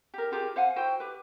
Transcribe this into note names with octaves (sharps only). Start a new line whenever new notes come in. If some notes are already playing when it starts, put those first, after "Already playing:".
G4 A#4
F4 G4 G#4 A#4
C5 F5 F#5 G#5
E4 F#4 C5 G5
G4 B4